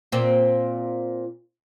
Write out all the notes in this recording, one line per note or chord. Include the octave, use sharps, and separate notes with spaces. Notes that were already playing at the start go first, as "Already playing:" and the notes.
A#2 C4